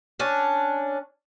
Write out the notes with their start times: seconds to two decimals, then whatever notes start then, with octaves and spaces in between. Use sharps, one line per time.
0.20 C#4 D4